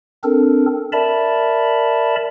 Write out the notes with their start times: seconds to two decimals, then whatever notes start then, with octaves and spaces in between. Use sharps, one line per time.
0.24 C4 D4 A4 A#4
0.93 A#4 D5 E5 A5 B5